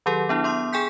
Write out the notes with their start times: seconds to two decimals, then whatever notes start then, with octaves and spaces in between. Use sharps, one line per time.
0.06 D#3 F#3 G4 A4
0.29 B3 D4 E4
0.44 B3 C6 D#6
0.73 G#4 G5 G#5 G6 B6